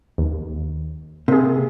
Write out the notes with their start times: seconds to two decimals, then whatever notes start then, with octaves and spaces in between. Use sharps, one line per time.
0.18 D#2
1.28 C3 A#3 G#4